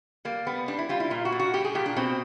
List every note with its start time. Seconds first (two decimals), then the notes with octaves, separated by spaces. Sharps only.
0.25 G3 A#3
0.47 G3 B3
0.68 G3 D4
0.78 E4
0.89 G3 F4
1.00 E4
1.10 A#2 F4
1.25 F#4
1.32 A#2
1.39 F#4
1.53 G3 G4
1.64 G#4
1.75 A#2 G4
1.86 D4
1.96 B2 C4